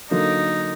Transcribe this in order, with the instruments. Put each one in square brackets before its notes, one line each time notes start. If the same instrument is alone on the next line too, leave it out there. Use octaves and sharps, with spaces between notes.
[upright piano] D3 F#3 A#3 [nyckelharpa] D#4